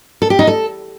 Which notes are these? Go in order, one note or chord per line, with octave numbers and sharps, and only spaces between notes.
A4
G4
D#4
A4